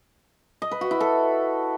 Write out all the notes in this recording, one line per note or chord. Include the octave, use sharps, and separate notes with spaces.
D#5
B4
F#4
E4
A4